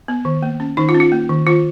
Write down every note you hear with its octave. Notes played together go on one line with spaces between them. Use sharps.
B3
D#3
A#3
C#4
D#3 D#4
F4
C#4
F4
A#3
D#3
D#3 F4